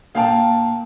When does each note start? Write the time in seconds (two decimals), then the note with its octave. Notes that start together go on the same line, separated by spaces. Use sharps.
0.15 A#2 A#3 D4 F5 G5 A5